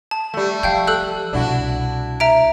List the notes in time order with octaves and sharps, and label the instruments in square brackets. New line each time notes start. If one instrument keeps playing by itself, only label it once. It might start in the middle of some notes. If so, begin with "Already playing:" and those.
[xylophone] A5
[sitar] G3 A3
[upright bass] F3 [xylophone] F5 G5 G6
[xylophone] A4 E6 F#6
[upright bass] C2 B2 [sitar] D4 E4 F#4
[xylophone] E5 A#5 D7